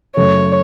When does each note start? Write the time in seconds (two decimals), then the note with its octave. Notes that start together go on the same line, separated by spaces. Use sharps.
0.16 F#2 C#3 A3 C#4 A4 C#5